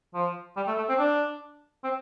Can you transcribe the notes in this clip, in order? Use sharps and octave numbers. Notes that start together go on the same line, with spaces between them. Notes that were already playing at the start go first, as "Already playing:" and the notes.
F3
G3
A3
A3
C4
D4
C4